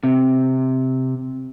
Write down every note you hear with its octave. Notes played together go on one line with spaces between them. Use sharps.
C3